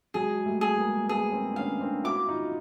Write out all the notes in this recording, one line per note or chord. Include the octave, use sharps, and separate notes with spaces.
F#3 G#3 G#4
G3 A3
G#4
G#3 A#3
A3 B3 G#4
A#3 C4
D4
B3 C#4 F5
C4 D4
E4 F#4 D6
D#4 F4